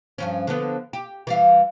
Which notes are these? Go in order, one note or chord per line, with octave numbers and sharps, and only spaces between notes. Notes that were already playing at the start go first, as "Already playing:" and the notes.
G2 F3 C#4
D3 F3 B3
G4
E3 G3 F5